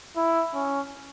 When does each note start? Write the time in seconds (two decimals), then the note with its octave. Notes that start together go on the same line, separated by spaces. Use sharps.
0.17 E4
0.54 C#4